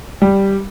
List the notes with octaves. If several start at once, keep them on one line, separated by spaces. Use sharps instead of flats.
G3